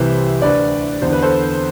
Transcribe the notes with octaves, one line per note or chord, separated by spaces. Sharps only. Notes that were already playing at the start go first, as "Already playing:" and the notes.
Already playing: C2 C3 E3 C5 E5
D2 D3 B4 D5
E2 D3 C5
B4
A4 C5